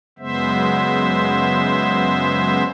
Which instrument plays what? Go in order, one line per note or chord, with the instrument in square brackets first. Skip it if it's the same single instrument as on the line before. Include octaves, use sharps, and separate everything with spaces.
[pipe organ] F#2 C#3 G#3 B3 C5 E5